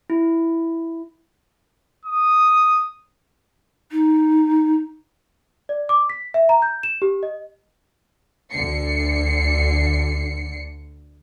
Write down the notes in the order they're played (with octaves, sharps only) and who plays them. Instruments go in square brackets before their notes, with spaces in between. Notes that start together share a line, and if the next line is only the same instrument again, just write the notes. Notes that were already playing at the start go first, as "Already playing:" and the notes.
[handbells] E4
[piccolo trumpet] D#6
[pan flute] D#4
[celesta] D5
D6
B6
E5
A#5
G6
E7
G4
D#5
[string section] D2 D3 C7 C#7